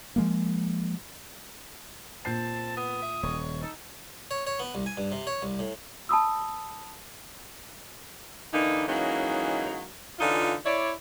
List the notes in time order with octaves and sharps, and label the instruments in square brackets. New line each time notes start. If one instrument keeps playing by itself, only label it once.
[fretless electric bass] F3 G#3 A#3
[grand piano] A#2 G6 C7 [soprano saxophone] C4 [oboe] A5
[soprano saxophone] B3 [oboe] D#6
[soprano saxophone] E5
[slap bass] D#1 [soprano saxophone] C#5
[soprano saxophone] D#4 [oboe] A4
[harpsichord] C#5
C#5
B3
C2
G#5
G2
C3
C#5
C2
A2
[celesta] A5 B5 D#6 E6
[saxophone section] D3 E3 A#3 D#4
E3 F#3 G#3 A#3 C#4 D#4
D3 E3 C#4 D#4 F4
E4 C#5 D5